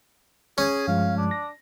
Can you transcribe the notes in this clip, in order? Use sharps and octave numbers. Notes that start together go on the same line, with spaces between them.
C#4 G#4
G2 F3 G#3 F5
D4
A#6